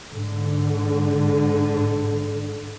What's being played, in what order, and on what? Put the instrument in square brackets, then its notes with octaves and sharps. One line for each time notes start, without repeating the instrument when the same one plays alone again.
[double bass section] G#2 D3